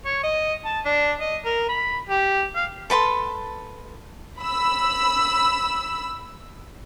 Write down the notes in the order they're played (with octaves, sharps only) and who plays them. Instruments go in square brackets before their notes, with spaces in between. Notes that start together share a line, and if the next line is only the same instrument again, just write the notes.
[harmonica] C#5
D#5
A5
D4
D#5
A#4
B5
G4
F5
[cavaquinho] A4 B4 A5 C6
[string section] B5 E6